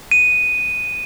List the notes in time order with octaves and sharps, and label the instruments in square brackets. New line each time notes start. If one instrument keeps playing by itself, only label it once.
[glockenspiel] D#7